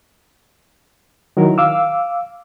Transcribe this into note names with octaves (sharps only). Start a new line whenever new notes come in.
D#3 F#3 E4 A#4
F5 D6 E6